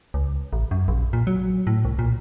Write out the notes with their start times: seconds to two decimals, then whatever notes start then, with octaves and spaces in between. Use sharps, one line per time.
0.14 C#2
0.53 A1
0.71 F#2
0.88 A#1
1.13 A#2
1.27 F#3
1.67 A2
1.85 C2
1.99 A#2